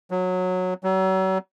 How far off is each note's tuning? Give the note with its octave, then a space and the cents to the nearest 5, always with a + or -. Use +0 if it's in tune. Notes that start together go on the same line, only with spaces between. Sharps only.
F#3 -15
F#3 +40